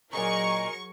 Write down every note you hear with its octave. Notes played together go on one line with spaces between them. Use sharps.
A#2 F#3 D#4 G#4 A#4 C#6